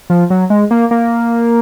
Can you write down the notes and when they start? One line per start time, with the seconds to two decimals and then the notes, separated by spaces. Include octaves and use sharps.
0.10 F3
0.30 F#3
0.50 G#3
0.71 A#3
0.91 A#3